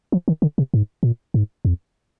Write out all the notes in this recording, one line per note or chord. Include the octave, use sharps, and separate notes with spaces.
F3
D#3
D3
C3
G#2
A#2
G#2
F2